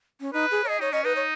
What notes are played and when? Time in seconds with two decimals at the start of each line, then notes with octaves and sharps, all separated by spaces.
0.21 C#4
0.33 D#4 B4
0.51 G#4
0.64 C#5
0.69 G#4 D#5
0.80 D#4 C#5
0.92 C#4 D#5
1.04 D#4 B4
1.16 C#5